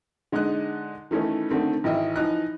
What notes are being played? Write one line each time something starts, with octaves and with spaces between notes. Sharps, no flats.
D3 G#3 D#4 D#5 F#6
D#3 E3 A3 C#4 D#4
D3 D#3 A3 C4
G#1 E3 D#5 E5
E3 F3 D#4 F#6